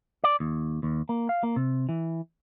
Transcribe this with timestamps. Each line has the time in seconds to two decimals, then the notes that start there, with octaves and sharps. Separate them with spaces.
0.24 D5
0.40 D#2
0.83 D#2
1.09 A#3
1.29 F5
1.43 A#3
1.56 C3
1.89 E3